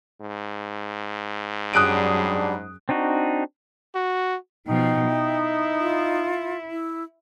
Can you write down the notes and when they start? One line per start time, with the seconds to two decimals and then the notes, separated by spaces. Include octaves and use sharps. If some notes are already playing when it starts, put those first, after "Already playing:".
0.21 G#2
1.73 F#2 F#3 G3 D4 G#4 D#6 F#6 D7
2.89 C4 D4 D#4 F#4
3.95 F#4
4.67 B2 F3 D#4 G5
5.11 E4
5.80 F4
6.70 E4